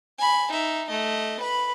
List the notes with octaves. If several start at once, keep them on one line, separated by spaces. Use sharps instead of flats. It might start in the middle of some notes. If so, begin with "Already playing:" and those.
G#5 B5
D#4 E5
A3 D#5
B4 B5